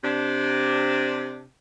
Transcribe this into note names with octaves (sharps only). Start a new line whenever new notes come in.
C3 D4